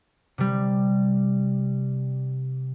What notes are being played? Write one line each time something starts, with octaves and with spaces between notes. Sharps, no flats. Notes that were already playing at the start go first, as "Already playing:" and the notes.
C3 G3